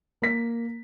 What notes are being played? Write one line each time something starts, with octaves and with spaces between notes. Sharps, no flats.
A#3 B6